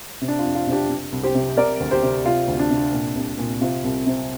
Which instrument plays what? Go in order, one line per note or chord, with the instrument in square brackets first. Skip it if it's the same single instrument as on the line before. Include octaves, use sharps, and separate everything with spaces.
[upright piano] C3
D4
F4
F2
F4
C3
D4 G4
C3
C2
G4 C5
C3
C3 A#4 D5
D2
G4 C5
C3
C3 F4
D2
D4
C3
A#2
C2
A#2
C3 F4
C2
C3